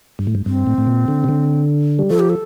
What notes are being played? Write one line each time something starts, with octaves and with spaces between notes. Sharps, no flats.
G2
A2
G2
G2 C4
A2
A2
A#2
D3
C3
D3
G3
F3 A4
G4
A4